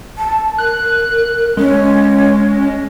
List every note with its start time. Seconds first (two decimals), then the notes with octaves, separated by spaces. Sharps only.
0.18 A5
0.58 A#4 F#6
1.57 G#3 C#4